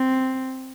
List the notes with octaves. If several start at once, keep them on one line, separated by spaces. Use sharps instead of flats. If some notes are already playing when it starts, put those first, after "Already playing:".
Already playing: C4